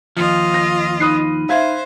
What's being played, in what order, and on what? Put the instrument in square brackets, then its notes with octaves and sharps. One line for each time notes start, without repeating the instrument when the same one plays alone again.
[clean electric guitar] D#2 F3 [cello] F4 D#5
[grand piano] A#6
[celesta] D#4 B5 D#7 [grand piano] D#6 F#6 C7
[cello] C5 [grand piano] E5 F5 G#6